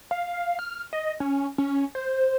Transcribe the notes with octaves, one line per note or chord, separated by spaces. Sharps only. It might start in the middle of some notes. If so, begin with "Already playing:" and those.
F5
F6
D#5
C#4
C#4
C5